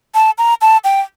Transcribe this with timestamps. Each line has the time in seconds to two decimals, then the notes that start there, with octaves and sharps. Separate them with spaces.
0.15 A5
0.38 A#5
0.61 A5
0.84 G5